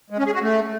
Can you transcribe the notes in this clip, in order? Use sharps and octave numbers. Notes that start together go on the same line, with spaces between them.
G#3
C#4
G#4
F#4
A3